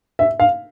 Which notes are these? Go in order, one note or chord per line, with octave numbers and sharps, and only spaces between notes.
E5
F5